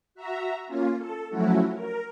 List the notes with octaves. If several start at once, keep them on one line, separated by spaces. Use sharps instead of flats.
F#4 E5 A#5
A#3 C#4 F4
A4
F3 F#3 A3 C#4 E4 F#4
A#4